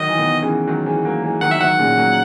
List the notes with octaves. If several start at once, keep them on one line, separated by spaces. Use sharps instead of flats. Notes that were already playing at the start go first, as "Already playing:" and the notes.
Already playing: D#3 F#3 D#5
E3
B2 D#3
C#3 E3
D#3 F#3
E3 G#3
F#3 A#3
E3 G#3
D#3 F#3 F#5
E5
D#3 F#3 F#5
A#2 C#3
F#3 A#3